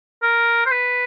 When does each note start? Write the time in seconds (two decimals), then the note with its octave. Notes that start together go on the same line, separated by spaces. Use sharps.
0.23 A#4
0.66 C5
0.71 B4